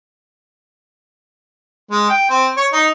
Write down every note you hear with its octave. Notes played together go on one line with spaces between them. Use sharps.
G#3
G5
C4
C#5
D#4